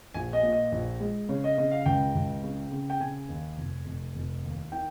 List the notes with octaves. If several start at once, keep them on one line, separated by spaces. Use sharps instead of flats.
A#1 G#5
D#5
A#2
D#5
A#1
G#3
C#3 C#5
D#5
C#3 D#5
F5
C#2 G5
C#2
C#3
C#3
G5
C#3 G#5
D#2
F1
F1
F1
D#2
D#3 G5